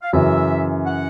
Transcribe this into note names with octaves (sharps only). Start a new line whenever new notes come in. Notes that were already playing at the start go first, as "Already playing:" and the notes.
F5
F#2 C#3 E3 E5
F#5